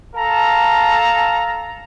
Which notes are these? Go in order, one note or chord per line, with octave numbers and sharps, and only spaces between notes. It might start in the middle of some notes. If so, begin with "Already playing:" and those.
A4 F5 A5 A#5